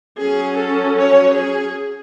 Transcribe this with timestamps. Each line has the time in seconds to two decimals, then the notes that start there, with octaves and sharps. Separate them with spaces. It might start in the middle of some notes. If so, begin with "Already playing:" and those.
0.18 F#3 C#4 G#4
0.56 A4
0.96 C#5
1.34 G#4